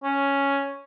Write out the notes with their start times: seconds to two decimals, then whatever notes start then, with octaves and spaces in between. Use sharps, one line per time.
0.04 C#4